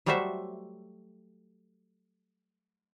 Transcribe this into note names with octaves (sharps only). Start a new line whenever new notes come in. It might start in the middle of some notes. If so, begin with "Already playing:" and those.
F#3 G3 A3 F#4 C5 E5